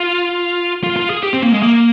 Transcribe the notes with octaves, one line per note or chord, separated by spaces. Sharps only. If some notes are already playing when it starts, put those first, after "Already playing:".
Already playing: F4
F4
F4
G#4
G4
C4
A#3
G#3
A#3